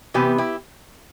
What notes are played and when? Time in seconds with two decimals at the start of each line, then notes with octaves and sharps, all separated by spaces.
0.14 C3 E3 B3 G4 B4
0.38 E4 G4